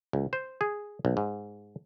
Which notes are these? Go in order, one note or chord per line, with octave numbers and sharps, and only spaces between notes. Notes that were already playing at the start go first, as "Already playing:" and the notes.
C#2
C5
G#4
B1
G#2